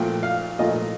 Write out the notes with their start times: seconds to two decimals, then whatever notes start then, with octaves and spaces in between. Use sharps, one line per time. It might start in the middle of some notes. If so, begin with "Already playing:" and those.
Already playing: A#2 F3 A3 G5
0.23 F5
0.59 A#2 F3 A3 D#5